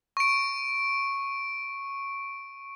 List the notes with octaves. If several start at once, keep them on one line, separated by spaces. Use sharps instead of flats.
C#6 D7